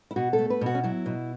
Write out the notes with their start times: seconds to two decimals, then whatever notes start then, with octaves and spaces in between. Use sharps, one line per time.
0.11 E4
0.16 B2 F#4
0.33 A4
0.38 A3
0.50 B4
0.61 B2 F#4
0.75 C#4
0.83 F#3 E4
1.06 B2